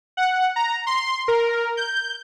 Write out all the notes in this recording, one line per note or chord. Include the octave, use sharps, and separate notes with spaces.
F#5
A#5
C6
A#4
G6